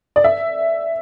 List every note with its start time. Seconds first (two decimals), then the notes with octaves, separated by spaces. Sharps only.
0.16 D5
0.24 E5